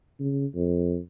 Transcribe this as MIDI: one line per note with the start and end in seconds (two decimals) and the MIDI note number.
0.20 0.46 49
0.55 0.98 41